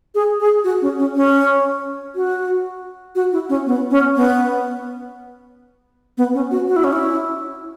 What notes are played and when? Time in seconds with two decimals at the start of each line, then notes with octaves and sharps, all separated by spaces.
0.15 G#4
0.40 G#4
0.64 F#4
0.82 C#4
0.99 C#4
1.15 C#4
2.15 F#4
3.15 F#4
3.32 E4
3.49 C#4
3.66 B3
3.91 C#4
4.16 B3
6.18 B3
6.34 C#4
6.51 F#4
6.68 F#4
6.76 E4
6.84 C#4
6.93 E4